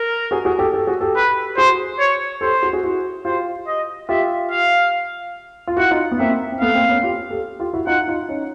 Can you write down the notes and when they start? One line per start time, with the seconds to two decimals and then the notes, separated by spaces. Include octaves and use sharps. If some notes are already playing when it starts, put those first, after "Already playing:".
Already playing: A#4
0.31 F#4 G#4
0.45 F#4 G#4
0.59 G4 A4
0.73 G4 A4
0.87 F#4 G#4
1.01 G4 A4
1.16 B4
1.57 F#4 G#4 C5
1.99 C#5
2.41 G4 A4 C5
2.63 F#4 G#4
2.73 F#4 G#4
2.83 E4 F#4
3.25 F4 G4 C5
3.67 D#5
4.09 F4 G4 E5
4.51 F5
5.67 F4
5.77 E4 F#4 F#5
5.91 D#4 F4
6.12 B3
6.19 A#3 C4 E5
6.52 C4
6.61 A3 B3 F5
6.75 A#3 C4
6.89 B3 C#4
7.03 F4 G4
7.31 G4 A4
7.60 F4 G4
7.73 E4 F#4
7.87 D#4 F4 F#5
8.08 D#4 F4
8.29 C#4 D#4